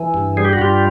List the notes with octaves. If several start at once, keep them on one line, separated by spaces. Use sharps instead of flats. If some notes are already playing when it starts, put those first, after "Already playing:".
Already playing: E3
G2
G3 G#4
G4
F#4
G2 F4 G4